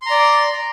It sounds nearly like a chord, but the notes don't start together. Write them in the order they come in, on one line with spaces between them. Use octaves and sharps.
C6 A#5 D5